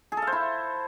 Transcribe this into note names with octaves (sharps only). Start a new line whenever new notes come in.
G#4
A4
F5
C5
E4